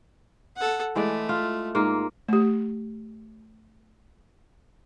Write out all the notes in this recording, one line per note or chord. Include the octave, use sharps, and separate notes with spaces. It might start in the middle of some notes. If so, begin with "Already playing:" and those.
A4 F#5
E3 G#3 A3 D5
F4
G#2 A#3 F4
A3 G4